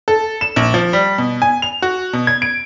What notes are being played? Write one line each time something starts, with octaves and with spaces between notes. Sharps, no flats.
A4
E7
A#1
F3
G3
B2
G#5
F7
F#4
B2
G#6
D7